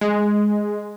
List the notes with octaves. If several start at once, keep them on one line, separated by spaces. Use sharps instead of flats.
G#3